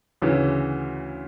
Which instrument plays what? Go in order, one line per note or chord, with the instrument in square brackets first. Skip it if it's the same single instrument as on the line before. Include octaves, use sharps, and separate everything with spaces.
[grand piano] D2 C#3 E3